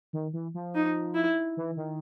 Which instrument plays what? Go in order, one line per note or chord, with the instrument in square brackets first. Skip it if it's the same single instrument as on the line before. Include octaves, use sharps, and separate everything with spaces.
[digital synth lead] D#3
E3
F3
[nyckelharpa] D#4
E4
[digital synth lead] E3
D#3